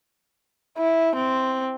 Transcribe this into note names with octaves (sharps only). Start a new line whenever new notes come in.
E4
C4